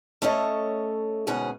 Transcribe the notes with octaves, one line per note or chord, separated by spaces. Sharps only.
A3 C#4 A4 C#5 D#5
D2 G#2 B2 C#4 G#4 F#5